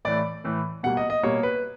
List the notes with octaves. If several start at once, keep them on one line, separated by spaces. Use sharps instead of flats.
A2 E3 A3 D5
A2 E3 A3
B2 G3 A#3 F#5
D#5
D#5
B2 G3 A#3 C#5
B4